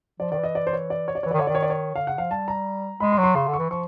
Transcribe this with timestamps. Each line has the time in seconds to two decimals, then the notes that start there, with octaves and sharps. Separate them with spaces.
0.20 F3 D5
0.32 D#3 D5
0.38 E3
0.44 D#5
0.55 D5
0.67 C5
0.73 C#5
0.90 D5
1.08 C#5
1.15 D5
1.23 E3 C#5
1.31 D#3 D5
1.38 D3 C#5
1.47 D#3 D5
1.55 C#5
1.62 D5
1.70 C#5
1.95 D3 F5
2.07 C#3 F#5
2.18 F3 F5
2.31 G3 A5
2.48 A#5
3.00 G#3 B5
3.12 C6
3.18 F#3
3.23 C6
3.35 C#3 C6
3.48 D3
3.53 C#6
3.59 E3
3.70 F3 C#6